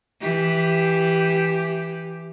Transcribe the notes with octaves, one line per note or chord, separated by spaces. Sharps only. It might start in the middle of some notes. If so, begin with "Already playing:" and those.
E3 G4